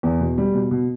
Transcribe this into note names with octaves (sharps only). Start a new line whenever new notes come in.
E2
B2
G3
B2
B2